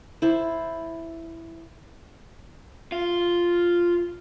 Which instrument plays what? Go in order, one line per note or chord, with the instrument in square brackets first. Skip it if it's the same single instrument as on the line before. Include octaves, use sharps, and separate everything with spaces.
[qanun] E4 C5 A5
[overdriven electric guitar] F4